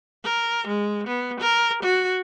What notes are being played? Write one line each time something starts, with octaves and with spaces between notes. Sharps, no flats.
A#4
G#3
B3
A#4
F#4